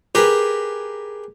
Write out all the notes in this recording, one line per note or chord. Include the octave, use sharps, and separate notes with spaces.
G4 G#4 A#4 B4